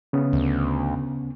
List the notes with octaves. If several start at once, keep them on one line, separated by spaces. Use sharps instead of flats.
C#3 B3 C#4
D2